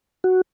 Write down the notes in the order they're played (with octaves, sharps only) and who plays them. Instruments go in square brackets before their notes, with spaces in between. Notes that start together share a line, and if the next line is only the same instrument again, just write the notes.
[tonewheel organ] F#4